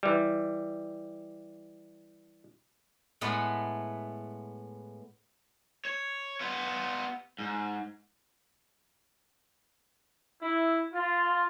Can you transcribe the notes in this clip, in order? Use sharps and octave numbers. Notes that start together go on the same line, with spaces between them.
E3 G3
A2 G#3 A3 B3
C#5
B3 F4
G#2
E4
F4